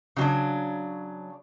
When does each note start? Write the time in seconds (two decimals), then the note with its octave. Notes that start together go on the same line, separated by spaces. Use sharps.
0.16 C#3 F#3 D4